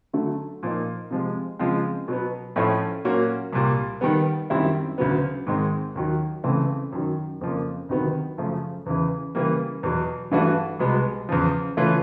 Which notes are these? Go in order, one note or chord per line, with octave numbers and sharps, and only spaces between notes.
D3 F#3 A3
A#2 F3 A#3 D#4
C3 F3 G#3
C#3 F3 G#3 C4 F4
B2 F#3 B3
A2 F3 A3 C#4
A#2 F#3 A#3 C#4 F#4
C2 A#2 G3
D#3 G3 B3
F#2 D#3 G3 C4 E4
D2 C#3 F#3 B3
G#2 D#3 G#3 C4 D#4
D#2 D#3 F#3
C#2 C#3 E3 A3 C4
F#2 D#3 F#3
F2 C#3 F3 A#3
D2 C3 D#3 F#3 B3
F#2 C#3 F3 A3
E2 C#3 E3
C#3 E3 G3 A#3
E2 B2 F#3
G2 E3 A3 D4 F#4
C2 B2 G#3 B3
E2 C#3 F3
C#3 E3 A3 C#4 F4